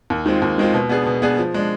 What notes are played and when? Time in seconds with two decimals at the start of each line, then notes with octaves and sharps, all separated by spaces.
0.10 D#2
0.26 D#3 G#3 C4 F4
0.42 D#2
0.58 D#3 G#3 C4 F4
0.74 B2
0.89 B3 D4 G#4
1.06 B2
1.22 B3 D4 G#4
1.39 F3
1.54 G#3 D4